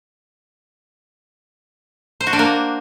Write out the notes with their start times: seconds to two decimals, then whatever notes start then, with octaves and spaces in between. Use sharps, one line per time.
2.20 C5
2.27 F#4
2.33 D4
2.39 A#3